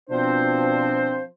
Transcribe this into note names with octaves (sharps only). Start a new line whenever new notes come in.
B2 F3 C4 D4 C5